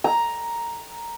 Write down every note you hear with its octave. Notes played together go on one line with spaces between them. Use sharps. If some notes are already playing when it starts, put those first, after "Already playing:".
A#5